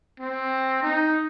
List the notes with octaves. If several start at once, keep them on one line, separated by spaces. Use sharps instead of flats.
C4
D#4